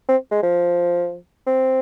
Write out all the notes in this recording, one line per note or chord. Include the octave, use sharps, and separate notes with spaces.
C4
G#3
F3
C4